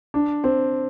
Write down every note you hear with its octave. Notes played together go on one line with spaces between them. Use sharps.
D4
C4